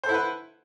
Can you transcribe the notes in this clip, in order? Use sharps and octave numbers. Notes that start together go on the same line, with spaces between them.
E4 A4 B4 C5 F#5